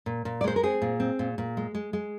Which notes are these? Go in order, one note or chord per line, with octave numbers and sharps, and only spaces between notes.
A#2
A#2
D5
G#3 C5
A#4
C4 G#4
A#2
C4
A#2
A#2
G#3
G#3
G#3